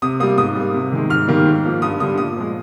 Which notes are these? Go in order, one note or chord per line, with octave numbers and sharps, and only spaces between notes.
C3 D#6
G3 A#3 D#6
G#2 D#6
G3 A#3
C3
D#3 G#3
G#2 F6
D#3 G3 A#3
G#2
F3 A#3
G2 D#6
D3 G3 D#6
A#2 D#6
F3 G#3